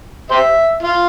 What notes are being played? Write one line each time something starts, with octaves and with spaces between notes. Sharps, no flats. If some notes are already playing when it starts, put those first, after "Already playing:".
G4 C5 E5
F4